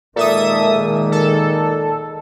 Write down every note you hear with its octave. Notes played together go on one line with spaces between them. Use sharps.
A#2 D#3 G#3 A4 E5 D#6
A4